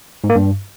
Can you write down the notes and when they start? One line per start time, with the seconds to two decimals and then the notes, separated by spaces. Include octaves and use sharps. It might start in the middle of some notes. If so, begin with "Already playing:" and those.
0.24 G#2
0.30 A#3
0.36 G2